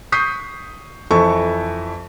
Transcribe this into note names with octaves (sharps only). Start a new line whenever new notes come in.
C#6 D#6 G6 B6 C7
F2 E3 A4 C#6